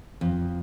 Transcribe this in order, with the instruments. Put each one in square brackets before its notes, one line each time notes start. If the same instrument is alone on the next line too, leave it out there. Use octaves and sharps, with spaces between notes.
[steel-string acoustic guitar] F2